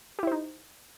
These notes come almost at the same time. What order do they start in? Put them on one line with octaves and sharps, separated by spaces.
G4 E4 C5 D#4